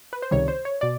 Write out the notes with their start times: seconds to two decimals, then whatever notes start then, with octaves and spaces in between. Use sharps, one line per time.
0.13 B4
0.22 C5
0.31 C#2 C3 D#3 G3 C#5
0.48 C5
0.65 C#5
0.81 B2 D5